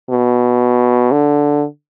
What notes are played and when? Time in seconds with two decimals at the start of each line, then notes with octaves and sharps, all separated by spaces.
0.10 B2
1.12 D3